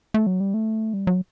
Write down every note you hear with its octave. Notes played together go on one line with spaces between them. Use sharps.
A3
F#3
G3
A3
G3
F#3